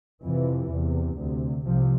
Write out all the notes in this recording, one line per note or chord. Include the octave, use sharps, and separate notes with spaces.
F2 C3 E3
E2 C3
D2 C3
C2 C3 F3